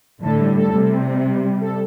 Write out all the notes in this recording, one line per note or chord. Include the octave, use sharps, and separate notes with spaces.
A2 D3 A4
G3
A4
C3 G3
C4
G3
G3
G3
A4